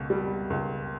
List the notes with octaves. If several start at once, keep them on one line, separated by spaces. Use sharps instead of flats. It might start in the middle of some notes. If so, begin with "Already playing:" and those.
Already playing: C#2 B2
G3
C#2